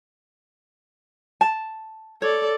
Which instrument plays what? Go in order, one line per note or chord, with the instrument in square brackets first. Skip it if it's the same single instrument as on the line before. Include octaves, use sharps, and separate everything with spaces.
[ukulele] A5
[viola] A4 D5 [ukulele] C#5